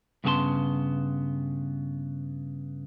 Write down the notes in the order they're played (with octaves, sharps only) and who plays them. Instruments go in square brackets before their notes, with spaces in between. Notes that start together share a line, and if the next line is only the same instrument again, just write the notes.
[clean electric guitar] G2 C#3 B3 G#4 A5 C6